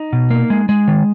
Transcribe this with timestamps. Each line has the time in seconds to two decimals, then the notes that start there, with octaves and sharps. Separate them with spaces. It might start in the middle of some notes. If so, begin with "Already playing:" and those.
Already playing: D#4
0.13 B2
0.30 A#3
0.50 G#3
0.69 G#3
0.88 D#3